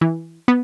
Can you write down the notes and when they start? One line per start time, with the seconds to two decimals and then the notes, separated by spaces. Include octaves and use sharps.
0.01 E3
0.48 B3